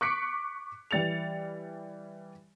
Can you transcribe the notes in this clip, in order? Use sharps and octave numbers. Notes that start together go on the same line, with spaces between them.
C#6 D6 F#6 B6 C#7 D7
E3 G3 A6 C#7 F7